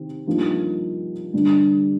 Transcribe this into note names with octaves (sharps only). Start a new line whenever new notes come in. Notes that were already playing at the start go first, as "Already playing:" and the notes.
Already playing: C3 D#3 C4
G2 F3 A#3 D#4
G2 D3 G3